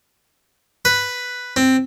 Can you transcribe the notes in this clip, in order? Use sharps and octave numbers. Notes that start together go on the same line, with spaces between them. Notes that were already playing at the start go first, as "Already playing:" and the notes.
B4
C4